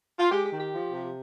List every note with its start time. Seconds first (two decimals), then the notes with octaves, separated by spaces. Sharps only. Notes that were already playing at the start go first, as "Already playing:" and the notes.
0.19 F4
0.31 G#3 G4
0.45 G4
0.51 D#3
0.59 G4
0.72 F3
0.92 C3